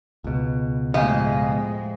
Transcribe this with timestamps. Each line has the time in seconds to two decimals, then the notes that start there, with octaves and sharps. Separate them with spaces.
0.24 C#2 B2
0.94 F2 A2 G#3 G4 D#5 F5 G#5